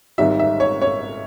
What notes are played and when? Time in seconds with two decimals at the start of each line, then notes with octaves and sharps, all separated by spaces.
0.18 G#1 G#2 D#3 G3 E5
0.39 E5
0.60 C#5
0.82 C#5